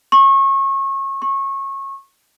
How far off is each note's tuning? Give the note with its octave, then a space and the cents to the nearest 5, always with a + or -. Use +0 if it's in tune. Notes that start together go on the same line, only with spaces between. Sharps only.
C#6 -30
C#6 -25